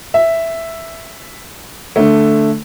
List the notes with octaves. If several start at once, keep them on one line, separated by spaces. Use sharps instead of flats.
E5
D3 A3